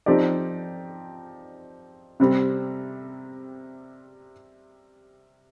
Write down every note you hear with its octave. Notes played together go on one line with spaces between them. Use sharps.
F3 C4 D#4 G4 D5
C3 G3 C4